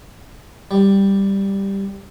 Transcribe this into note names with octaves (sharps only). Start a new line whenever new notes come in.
G3